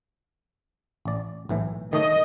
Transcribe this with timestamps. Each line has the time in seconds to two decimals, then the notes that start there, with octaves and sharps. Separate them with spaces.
1.05 A1 D5
1.49 B1 A2 E3
1.93 D#3 A3 C#5 D#5